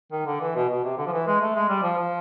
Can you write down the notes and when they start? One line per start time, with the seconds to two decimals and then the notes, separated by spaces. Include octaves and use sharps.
0.12 D#3
0.26 D3
0.41 E3
0.55 B2
0.69 B2
0.84 C3
0.98 D3
1.07 F3
1.12 E3
1.27 G#3
1.41 A3
1.55 G#3
1.69 G3
1.83 F3
1.97 F3